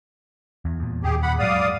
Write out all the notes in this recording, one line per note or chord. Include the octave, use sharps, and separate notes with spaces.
E2
E2 A#2
D#2 A#2 G4 G#4
F#5 B5
G#2 F#3 D5 F5 D#6